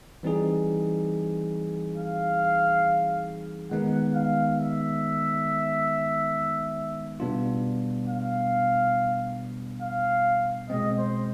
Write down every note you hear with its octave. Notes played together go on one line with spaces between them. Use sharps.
E3 G3 C4 D#4 G#4
F5
D#3 G#3 B3 D#4 F#5
F5
E5
B2 G3 B3 D4 F4
F5
F5
B2 G#3 C4 D#5
C5